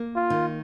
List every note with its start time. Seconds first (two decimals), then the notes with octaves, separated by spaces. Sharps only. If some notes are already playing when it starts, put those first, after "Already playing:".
Already playing: A#3
0.16 F4
0.30 D#3